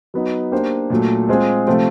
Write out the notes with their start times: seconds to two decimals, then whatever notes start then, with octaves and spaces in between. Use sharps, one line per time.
0.14 F#3 B3 D#4
0.52 A#3 D4 G4 C5
0.90 A#2 F#3 A3
1.29 G#3 C4 F4 G#4
1.67 C3 F3 A3 C4 F4